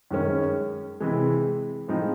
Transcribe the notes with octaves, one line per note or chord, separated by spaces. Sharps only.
F#2 D#3 G#3 C#4
C3 E3 G#3
A2 F3 G#3 C4 D#4